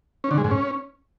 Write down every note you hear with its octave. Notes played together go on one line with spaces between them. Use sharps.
C#4
D3
G#3
G#2
C#4